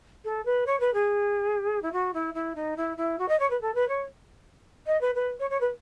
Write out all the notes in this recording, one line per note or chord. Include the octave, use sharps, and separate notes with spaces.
A4
B4
C#5
B4
G#4
E4
F#4
E4
E4
D#4
E4
E4
F#4
D#5
C#5
B4
A4
B4
C#5
D#5
B4
B4
C#5
C#5
B4